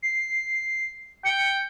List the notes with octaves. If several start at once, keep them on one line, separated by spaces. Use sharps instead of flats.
C7
G5 C#7